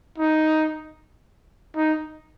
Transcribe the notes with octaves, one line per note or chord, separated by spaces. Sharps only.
D#4
D#4